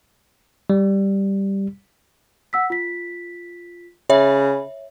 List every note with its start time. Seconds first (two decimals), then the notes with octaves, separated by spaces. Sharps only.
0.70 G3
2.53 F#5 E6 B6
2.70 F4 B6
4.10 C#3 C#5 E5 B5